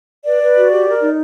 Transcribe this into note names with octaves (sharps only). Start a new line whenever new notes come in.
B4 D5
B4
F#4
G4
A#4
D#4